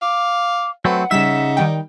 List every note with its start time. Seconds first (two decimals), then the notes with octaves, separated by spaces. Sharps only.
0.02 F5 D6
0.85 F#3 A3 C4 B4 F#5
1.11 C#3 G3 D#4 E5 B6 E7
1.57 D#3 G3 G5